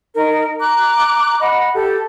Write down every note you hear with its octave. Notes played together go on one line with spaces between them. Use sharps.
D#4 A#4
A#5 D6 F#6
D#5 F#5 B5
G4 A4